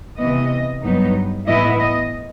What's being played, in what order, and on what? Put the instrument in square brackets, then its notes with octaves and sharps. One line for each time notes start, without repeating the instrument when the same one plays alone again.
[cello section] C3 E3 B3 D#5
G2 F#3 B3 D#4
A2 E3 B3 E4 D#5
D#5